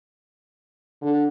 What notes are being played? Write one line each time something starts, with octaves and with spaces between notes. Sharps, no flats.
D3